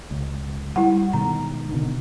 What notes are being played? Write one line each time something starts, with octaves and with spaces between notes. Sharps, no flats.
C#2
G3 E4 F#5
B2 D#3 G#3 A#5
B2 D3 D#3